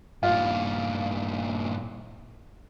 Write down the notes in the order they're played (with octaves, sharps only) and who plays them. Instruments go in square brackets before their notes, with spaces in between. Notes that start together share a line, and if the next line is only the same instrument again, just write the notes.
[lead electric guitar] G2 A#2 [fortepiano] F4